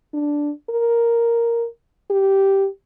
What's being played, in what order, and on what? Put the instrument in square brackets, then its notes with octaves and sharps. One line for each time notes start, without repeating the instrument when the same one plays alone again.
[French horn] D4
A#4
G4